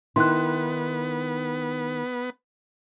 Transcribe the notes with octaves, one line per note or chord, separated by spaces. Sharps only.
D#3 B3 D#4 E4 C6 F#6